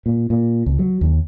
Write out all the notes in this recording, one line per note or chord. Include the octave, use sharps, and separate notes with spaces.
A#2
A#2
C#2
F#3
D#2